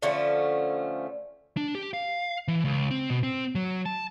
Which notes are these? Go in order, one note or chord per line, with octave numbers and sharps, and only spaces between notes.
D3 F3 A3 C#4
D4
G4
F5
E3
C#2
C4
B2
C4
F#3
A5